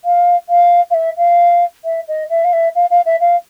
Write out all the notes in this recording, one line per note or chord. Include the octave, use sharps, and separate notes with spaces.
F5
F5
F5
E5
F5
E5
D#5
E5
F5
E5
F5
F5
E5
F5